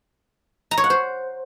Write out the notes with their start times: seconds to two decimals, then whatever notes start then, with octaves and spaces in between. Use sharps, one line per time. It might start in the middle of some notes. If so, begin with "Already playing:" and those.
0.71 A#5
0.78 C#5
0.84 F#5
0.90 C5